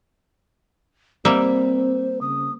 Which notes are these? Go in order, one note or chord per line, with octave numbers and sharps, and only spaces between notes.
G3 A#3 C4 C5 E5
C#3 D#6